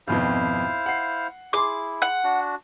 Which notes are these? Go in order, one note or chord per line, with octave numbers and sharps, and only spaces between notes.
G#1 F2 B2 E4 C5 F5
F#5 C7
E4 G#4 C6 D6
F#5
D4 F#4